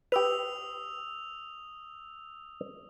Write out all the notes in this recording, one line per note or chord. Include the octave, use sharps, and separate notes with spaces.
G4 B4 D#6 E6 F7